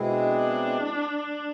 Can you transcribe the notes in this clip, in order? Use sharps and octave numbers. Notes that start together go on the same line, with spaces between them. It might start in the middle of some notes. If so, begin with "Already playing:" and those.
Already playing: B2 G#3 C4 E4 G#4
D4